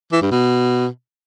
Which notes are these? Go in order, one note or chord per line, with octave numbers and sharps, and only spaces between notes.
E3
G2
B2